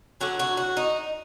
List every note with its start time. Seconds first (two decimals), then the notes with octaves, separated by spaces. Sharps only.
0.21 D3 F#3 F#4
0.39 F#4
0.57 F#4
0.77 D#4